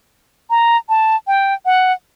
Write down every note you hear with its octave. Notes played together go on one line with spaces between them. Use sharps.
A#5
A5
G5
F#5